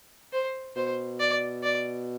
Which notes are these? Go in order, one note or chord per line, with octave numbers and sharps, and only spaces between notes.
C5
B2 C5
D5
D5